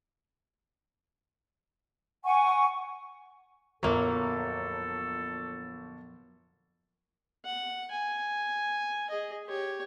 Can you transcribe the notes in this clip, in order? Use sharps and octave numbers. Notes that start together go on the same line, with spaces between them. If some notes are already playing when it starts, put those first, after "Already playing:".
F#5 G#5 C#6
G1 F2 A#2 F#3 A#3 A4
F#5
G#5
G#4 D#5
G4 C#5